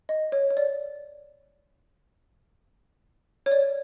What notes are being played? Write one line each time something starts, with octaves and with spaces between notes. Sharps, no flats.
D#5
C#5
C#5
D5
C#5
D5